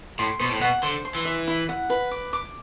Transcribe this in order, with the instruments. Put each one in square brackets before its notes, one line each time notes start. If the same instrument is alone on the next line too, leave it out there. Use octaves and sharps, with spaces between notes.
[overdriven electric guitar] A2 [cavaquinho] C6
[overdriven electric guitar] B2 [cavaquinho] C5
[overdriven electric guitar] A2
[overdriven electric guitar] B2 [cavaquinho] F#5
[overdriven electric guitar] D3 [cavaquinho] C5
[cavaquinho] C6
[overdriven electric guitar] E3
[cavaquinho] E5
E4
F#5
B4
D6
D6